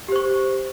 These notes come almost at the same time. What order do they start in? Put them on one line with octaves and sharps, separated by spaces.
G4 C5 C#6